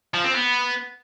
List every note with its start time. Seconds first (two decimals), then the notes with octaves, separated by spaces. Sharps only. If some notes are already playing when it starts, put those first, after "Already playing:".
0.14 F3
0.24 C4
0.34 B3